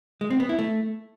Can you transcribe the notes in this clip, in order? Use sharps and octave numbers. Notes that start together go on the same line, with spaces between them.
G#3
C4
B3
E4
A3